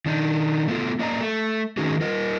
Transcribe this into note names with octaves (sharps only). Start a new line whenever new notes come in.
D#3 D4 D#4
A3 B3 F4
A#3 D5 D#5 A5 A#5
A3
D#3 A3 C#4 D#4 F#4 G#4
F4 A#4 D#5